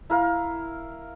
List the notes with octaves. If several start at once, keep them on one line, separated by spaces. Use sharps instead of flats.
E4 A#4 F5